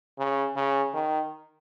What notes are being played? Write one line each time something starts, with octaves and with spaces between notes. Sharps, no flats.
C#3
C#3
D#3